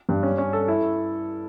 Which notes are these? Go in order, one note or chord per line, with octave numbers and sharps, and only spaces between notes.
G2
C#4
C#4
A4
E4